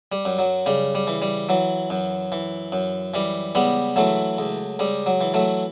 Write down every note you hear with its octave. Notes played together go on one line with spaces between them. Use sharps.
G3
F#2
F#3
C#3 G3
G3
E3
G3
E3 F#3
F#2
E3
F#2
E3 G3
C#2 G3 B3
E3 F#3 A3
C#2
C#2 G3
F#3
E3
F#3 A3